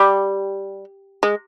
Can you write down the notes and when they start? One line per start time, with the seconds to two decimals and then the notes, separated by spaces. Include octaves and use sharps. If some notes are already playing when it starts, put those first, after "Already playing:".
Already playing: G3
1.23 G#3